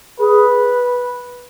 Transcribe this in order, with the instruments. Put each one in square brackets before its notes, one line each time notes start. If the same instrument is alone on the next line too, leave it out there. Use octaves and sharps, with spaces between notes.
[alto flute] G#4 [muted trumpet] B4